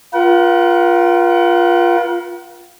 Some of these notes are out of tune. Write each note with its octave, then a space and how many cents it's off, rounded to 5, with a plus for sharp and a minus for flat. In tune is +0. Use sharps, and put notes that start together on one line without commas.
F4 +0 A#4 +45 F#5 +40